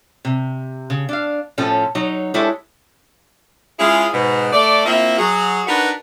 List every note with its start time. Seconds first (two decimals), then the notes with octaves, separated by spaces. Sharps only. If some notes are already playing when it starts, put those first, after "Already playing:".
0.25 C3
0.90 C#3
1.09 D4 F5
1.58 A2 F3 C#4 A4
1.95 F#3 D#4 C#5
2.34 G#3 D4 E4 G4 A4 C#5
3.79 G#3 C#4 E4 F4 G#4
4.14 G#2 B2
4.53 A3 D5
4.85 A#3 C4 E4 F4 A#4 E5
5.19 F#3 F#4 G#4
5.68 D4 D#4 F#4 A#4 B4